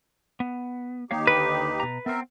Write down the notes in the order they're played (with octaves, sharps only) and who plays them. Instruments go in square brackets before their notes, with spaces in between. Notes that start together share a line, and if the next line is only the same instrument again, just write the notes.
[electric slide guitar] B3
[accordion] D#2 D#4 G4 [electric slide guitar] A#3 C#5 F5
[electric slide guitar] D3 [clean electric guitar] B4
[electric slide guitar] B2 A#5
[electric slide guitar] B3 C4 [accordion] A#4 E5